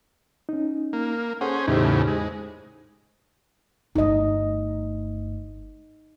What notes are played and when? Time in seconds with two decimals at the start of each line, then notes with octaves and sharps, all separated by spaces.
0.49 C#4 D#4
0.93 A#3
1.41 C#4 G#4 A4 C5 F#5
1.68 E2 A2 C#3 D#4 G4 C5
2.07 G#3
3.95 G1 A3 D#4 D#5